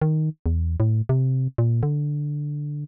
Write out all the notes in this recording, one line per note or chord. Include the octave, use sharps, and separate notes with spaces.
D#3
E2
A2
C3
A#2
D3